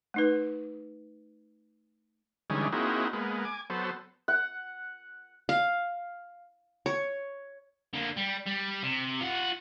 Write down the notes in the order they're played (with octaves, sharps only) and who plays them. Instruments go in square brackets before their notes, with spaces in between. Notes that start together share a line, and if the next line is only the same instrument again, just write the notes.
[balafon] A3 D#4 B4
[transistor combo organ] D3 E3 G3 G#3 C#4 D#4
A#3 C4 D#4 E4 F#4 G#4
G#3 A#3 B3
G#5 D6
F#3 B3 A4 C5
[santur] F#5
[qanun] F5
C#5
[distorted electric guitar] D3 A#3
G3
G3
C3
F4 F#5